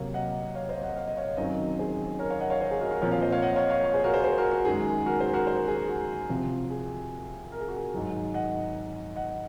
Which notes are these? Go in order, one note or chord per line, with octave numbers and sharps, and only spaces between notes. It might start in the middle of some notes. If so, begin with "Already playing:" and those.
Already playing: C3 F#3 A#3 C#5 F5
D#5 F#5
C#5 F5
C5 D#5
D#5 F#5
F5
D#5
C#5 F5
F#2 D#3 F#3 C4 C5 D#5
G#4 C5
A#4 C#5
C#5 F5
D#5 F#5
C#5 F5
C5 D#5
G#4
F#4 A#4
F#4 A#4
A#2 F3 C4 A#4 C#5
C#5 F5
C5 D#5
C#5 F5
D#5 F#5
C#5 F5
C#5 F5
C#5 F5
G#4 C5
F#4 A#4
G#4 C5
G#4 C5
F#4 A#4
F#4
F#2 D#3 G#3 G#4
F#4 A#4
G#4 C5
F#4 A#4
G#4 C5
G#4
F#4
C3 F3 C4
G#4
A#4
G#4
F#4
G#4
G#2 D#3 F#3
D#5 F#5
D#5 F#5